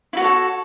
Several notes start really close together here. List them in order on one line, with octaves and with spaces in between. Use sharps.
E4 F#4 C#5 A4